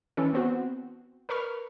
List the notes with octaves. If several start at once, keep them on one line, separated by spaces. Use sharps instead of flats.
E3 C#4 A4
B3 C4 F#4
A#4 B4 B5 C#6 F6